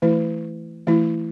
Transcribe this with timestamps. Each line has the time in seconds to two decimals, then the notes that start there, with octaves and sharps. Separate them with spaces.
0.02 E3 A3 E4
0.87 E3 A3 E4